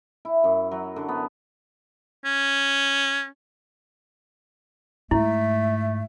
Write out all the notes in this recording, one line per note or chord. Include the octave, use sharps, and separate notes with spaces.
E4
F#2
F#3
D3
B3
C#4
G#2 A3 E4 E5